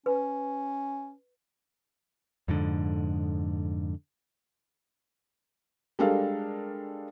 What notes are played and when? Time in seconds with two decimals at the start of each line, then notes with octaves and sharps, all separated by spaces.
0.06 C#4 B4
2.48 F2 G#2 D3
5.99 G3 G#3 D4 A4 A#4 F5